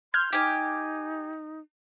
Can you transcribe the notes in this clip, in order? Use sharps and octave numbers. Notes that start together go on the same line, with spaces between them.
C6 F6 G6 G#6
D#4 G4 G#5